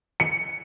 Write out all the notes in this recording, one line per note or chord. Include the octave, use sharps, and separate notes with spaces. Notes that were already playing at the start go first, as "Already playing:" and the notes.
C#7